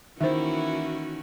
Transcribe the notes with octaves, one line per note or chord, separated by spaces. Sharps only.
D#3 E3 A#3 C#4 E4 F#4 C5 E5